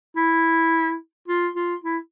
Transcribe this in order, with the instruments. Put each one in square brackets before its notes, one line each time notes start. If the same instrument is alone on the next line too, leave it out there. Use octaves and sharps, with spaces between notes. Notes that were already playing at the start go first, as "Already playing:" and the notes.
[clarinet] E4
F4
F4
E4